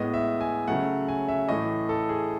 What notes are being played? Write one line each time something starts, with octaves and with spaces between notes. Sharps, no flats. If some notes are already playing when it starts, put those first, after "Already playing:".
Already playing: A2 G#3 B3 D#5
E5
G#5
C#3 F#3 A3 F#5
G#5
E5
A2 E3 A3 D#5
A4
G#4